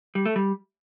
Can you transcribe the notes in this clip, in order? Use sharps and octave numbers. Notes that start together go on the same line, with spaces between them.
G3
A3
G3